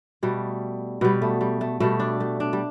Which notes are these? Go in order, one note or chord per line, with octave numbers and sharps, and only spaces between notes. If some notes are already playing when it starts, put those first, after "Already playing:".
B2 G3 A3
B2 G3 B3
A3
G3
A3
B2 G3 A3
D4
A3
D4
G3